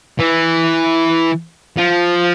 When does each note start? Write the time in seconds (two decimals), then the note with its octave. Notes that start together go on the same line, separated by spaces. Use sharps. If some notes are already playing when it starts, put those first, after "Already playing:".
0.19 E3
1.77 F3